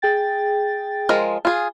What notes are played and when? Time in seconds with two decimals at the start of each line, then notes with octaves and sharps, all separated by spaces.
0.02 G#4 G5 A6
1.09 F3 G#3 A#4
1.45 F4 G#4